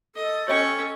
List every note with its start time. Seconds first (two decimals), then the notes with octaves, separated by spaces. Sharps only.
0.16 A4 D#5
0.48 C#4 C#5 D#5 G5 C#6